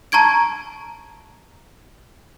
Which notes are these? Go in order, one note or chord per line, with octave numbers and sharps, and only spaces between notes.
A5 A#5 C#6 G#6 D7